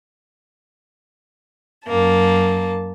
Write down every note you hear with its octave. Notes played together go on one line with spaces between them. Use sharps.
F#2 A#3 A5